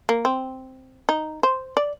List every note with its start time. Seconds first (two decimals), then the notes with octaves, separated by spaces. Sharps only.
0.09 A#3
0.25 C4
1.09 D#4
1.43 C5
1.77 D5